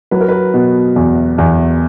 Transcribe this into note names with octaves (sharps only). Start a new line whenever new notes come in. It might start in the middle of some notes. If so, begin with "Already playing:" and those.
F#3 B4
A#4
B4
B2
E2
E2